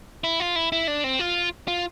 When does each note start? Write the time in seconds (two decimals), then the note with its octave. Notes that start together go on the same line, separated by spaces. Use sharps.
0.24 E4
0.40 F4
0.56 E4
0.72 E4
0.88 D4
1.04 C4
1.19 F4
1.68 F4